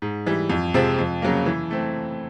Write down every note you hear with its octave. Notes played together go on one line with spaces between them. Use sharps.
G#2
E3 G3
F2
C3 F3 G#3 C4
F2
C#3 F#3 A#3
E3
A3 C4